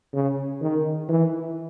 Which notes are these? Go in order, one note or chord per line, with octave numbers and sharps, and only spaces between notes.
C#3
D#3
E3